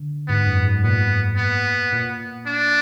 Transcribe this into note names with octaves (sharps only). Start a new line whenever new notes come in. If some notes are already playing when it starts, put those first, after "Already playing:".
Already playing: D3
G#2 B3
F#2
G#2
A#2 B3
B3
A#2
D4